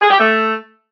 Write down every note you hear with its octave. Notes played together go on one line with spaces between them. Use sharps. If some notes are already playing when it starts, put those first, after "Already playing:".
G#4
G4
A3